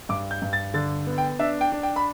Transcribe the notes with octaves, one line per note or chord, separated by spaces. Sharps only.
G2 D6
G6
G2
A6
D3 A6
B3
G5
D4 E5
G5
D4
G5
B5